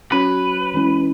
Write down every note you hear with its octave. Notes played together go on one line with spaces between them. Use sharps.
F#3 C#4 F#4 B4 C#5
E3 G#3 C#4 E4